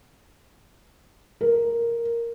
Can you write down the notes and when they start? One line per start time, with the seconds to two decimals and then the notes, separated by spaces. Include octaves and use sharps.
1.41 A#4